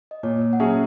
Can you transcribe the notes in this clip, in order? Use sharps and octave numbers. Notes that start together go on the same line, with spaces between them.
D#5
A#2 C#5
F#5
F#3 C#4 G#4 E5